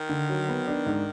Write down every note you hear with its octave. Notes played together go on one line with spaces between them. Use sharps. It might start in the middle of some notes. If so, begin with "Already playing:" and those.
Already playing: D#3
D3
F#3
B3
D4
G#2